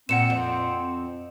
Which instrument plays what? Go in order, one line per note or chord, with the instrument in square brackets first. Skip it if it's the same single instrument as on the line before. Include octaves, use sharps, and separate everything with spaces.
[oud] A#2 [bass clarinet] C4 [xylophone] F#5 C#7 E7
[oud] F2